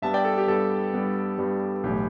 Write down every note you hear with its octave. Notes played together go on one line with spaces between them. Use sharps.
G2 G3 B3 E5 A5
D5 G5
A4
G4
G2 G3 B3 A4
G2 G3 B3
G2 G3 B3
B1 A2 E3 A3 G4